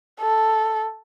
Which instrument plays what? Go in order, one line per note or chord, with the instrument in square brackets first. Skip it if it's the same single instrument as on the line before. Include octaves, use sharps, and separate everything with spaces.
[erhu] A4